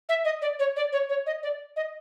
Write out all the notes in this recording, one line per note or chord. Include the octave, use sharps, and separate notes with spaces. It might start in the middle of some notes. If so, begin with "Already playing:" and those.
E5
D#5
D5
C#5
D5
C#5
C#5
D#5
D5
D#5